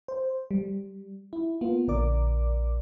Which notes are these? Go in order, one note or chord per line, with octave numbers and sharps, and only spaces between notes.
C5
G3
E4
A#3 B3 F4
A#1 D3 A#4 D5 D6